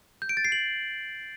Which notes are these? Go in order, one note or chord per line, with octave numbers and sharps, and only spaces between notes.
G6
D7
A6
C7
F#7